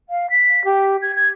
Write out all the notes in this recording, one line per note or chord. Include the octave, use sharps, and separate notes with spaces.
F5
B6
G4
G#6
G#6